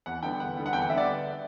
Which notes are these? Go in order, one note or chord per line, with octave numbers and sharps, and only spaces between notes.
E2 F#5
D3 G3 B3 G5
E2 F#5
D3 G3 B3
F#5
E2 G5
F#5
D3 G3 B3 E5
D5